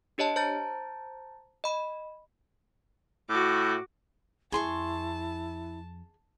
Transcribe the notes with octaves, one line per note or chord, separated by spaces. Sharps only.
D4 G4 C#5 D#5 A5
C5 A5 A#5 G6 A6
D#5 B5
A2 F#4 D6
F2 E4 G#4 A5 C6 C#6